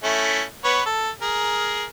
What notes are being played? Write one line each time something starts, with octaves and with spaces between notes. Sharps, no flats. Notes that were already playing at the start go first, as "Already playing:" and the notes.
A3 C#4 E4
B3 B4 C#5
A4
G#4 A#4